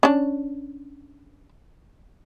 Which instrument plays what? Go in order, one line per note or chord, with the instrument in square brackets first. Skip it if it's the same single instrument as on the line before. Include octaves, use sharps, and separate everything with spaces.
[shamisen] C#4 D4